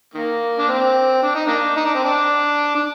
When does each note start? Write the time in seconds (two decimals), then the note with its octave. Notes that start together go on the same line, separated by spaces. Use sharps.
0.14 D#3 A#3
0.58 D4
0.68 C4
1.23 D4
1.35 D#4
1.47 A#3 D4
1.76 D#4
1.85 D4
1.95 C4
2.04 D4
2.75 D4